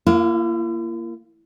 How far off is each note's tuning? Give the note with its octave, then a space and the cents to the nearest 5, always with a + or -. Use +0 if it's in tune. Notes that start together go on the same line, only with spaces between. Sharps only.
A#3 -5 E4 +45 F5 +35